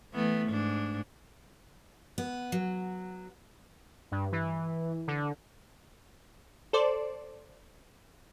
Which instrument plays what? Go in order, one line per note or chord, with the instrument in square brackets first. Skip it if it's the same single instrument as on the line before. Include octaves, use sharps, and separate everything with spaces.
[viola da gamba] E3 A3 B3
G#2 D4
[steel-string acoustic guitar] B3
F#3
[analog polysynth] G2
E3
D3
[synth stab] A4 C5 D5